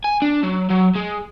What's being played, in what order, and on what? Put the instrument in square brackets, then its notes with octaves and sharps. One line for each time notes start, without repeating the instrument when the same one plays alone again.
[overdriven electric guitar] G#5
D4
F#3
F#3
G#3